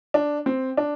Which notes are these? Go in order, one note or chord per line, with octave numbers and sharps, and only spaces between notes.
D4
C4
D4